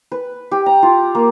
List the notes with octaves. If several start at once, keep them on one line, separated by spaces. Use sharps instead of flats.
B4
G4
A#5
F4
A#3